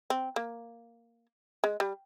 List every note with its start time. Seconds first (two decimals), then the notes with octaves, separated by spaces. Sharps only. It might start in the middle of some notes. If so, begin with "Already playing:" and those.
0.10 C4
0.36 A#3
1.64 G#3
1.80 G3